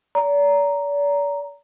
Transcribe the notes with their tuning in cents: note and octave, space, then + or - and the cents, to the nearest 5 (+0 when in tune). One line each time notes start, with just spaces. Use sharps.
D5 -40 A#5 +0